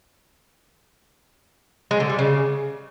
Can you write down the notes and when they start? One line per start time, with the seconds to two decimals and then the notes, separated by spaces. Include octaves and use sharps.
1.91 G#3
2.00 D3
2.09 G3
2.19 C#3